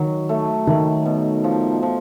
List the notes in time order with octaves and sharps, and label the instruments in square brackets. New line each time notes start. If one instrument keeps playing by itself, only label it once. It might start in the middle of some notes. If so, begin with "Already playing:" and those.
Already playing: [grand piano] D#3 [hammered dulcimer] F#3
[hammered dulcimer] A3
[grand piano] D#3 [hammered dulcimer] A3
[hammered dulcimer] B2
F3
F3